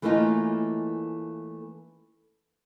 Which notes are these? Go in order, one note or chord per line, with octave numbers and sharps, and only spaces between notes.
E3 A3 A#3 C#4 D#4 F4